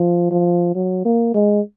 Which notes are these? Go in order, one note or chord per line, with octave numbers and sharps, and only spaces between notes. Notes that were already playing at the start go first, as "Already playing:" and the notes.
Already playing: F3
F3
F#3
A#3
G#3